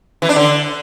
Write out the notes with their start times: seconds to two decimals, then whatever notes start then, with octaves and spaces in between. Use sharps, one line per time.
0.22 E3
0.29 D4
0.36 D3